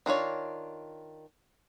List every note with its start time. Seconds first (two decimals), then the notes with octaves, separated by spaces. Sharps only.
0.06 D#3 D4 F4 C#5